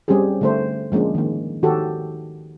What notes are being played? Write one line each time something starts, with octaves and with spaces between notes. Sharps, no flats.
G3 C4 C#4 G4 G#4
D3 A3 C5
F3 G#3 A#3 C#4 D4
D#3 A#3
D#3 F#4 G4 A4